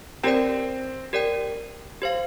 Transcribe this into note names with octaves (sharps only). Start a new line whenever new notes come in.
C4 G4 A#4 D5 G5
G4 A#4 D5 G5
G4 C5 F5